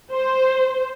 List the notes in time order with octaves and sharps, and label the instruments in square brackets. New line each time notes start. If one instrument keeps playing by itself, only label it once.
[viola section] C5